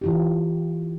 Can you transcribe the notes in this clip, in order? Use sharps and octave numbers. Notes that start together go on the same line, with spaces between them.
E3 F4 G4